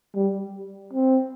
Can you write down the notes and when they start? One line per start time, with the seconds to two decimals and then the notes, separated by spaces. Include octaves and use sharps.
0.15 G3
0.93 C4